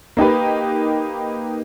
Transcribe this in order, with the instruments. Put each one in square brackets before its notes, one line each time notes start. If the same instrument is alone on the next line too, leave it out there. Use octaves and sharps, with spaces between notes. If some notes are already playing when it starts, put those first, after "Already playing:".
[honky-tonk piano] A#3 D#4 G4 B4